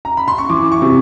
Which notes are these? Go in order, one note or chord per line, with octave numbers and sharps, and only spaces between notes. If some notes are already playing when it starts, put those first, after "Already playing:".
A#5
B5
C6
C#6
E3 D6
C#6
C3